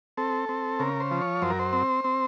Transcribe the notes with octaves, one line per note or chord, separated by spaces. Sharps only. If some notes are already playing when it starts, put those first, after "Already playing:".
C4 A4
C4
C#3 A#4
C5
F3
C#5
F#2 C5
A#4
C5
C4
C4